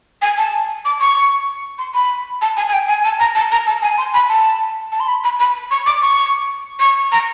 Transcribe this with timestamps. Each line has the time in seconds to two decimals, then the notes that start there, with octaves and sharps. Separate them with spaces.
0.22 G#5
0.38 A5
0.85 D6
1.01 C#6
1.79 C6
1.94 B5
2.42 A5
2.57 G#5
2.68 G#5
2.73 G5
2.88 G#5
3.04 A5
3.20 A#5
3.35 A5
3.52 A#5
3.67 A5
3.82 G#5
3.98 C6
4.14 B5
4.29 A5
4.92 A5
5.00 C6
5.08 B5
5.24 B5
5.39 B5
5.71 C#6
5.86 D6
6.02 C#6
6.80 C#6
7.12 A#5